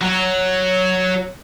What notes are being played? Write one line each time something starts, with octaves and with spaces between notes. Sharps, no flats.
F#3